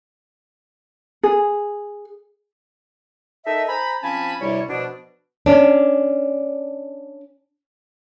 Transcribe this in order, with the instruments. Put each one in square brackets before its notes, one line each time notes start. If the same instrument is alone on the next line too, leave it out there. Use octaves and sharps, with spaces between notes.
[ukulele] G#4
[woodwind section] D#4 A4 A#4 D#5 E5
C5 G#5 A#5 B5
F3 C4 C#4 G#5 A5 B5
D2 G2 C3 G3 E4 C#5
B2 F3 D4
[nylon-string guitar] C#4 D4